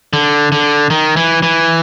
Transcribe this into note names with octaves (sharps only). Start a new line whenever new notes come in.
D3
D3
D#3
E3
E3